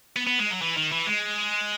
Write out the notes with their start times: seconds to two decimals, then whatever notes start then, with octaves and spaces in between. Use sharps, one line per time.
0.16 B3
0.27 B3
0.39 G#3
0.51 F#3
0.62 E3
0.77 D#3
0.92 E3
1.07 G#3